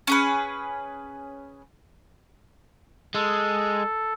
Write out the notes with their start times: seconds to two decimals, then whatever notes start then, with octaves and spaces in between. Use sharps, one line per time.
0.07 C#4 G#4 B4
3.15 G#3 A4